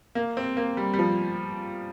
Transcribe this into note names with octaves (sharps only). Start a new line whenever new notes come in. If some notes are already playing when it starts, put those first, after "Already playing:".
A#3
C4
A#3
G3
G3
F3